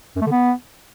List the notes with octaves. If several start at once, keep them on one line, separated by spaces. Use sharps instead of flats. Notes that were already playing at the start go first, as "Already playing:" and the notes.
F#2
A3
D3
B3